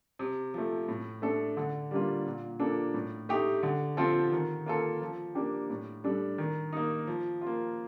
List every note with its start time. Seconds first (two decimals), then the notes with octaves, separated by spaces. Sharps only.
0.19 C3
0.54 F3 A3
0.89 A2
1.22 A3 D4 A4
1.57 D3
1.91 G3 A#3 D4 F4
2.26 A#2
2.60 F3 A#3 D4 A4
2.94 A2
3.29 A3 D#4 G4
3.63 D3
3.97 F3 C4 F4 A4
4.32 D#3
4.66 A#3 F4 A4
5.01 F3
5.35 A#3 D4 G4
5.70 A2
6.04 G3 D4 A4
6.38 D#3
6.73 A#3 D#4
7.07 F3
7.41 F4
7.47 A#3